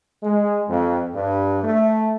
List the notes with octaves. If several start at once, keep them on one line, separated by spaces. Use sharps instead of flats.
G#3
F2
G2
A3